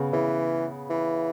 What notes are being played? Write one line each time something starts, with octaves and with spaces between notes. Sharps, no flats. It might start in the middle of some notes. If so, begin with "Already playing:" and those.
Already playing: C#3 B3
C#3 E3
E3